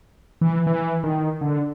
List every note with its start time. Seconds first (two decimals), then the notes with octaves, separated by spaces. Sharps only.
0.41 E3
0.67 E3
1.04 D#3
1.41 D3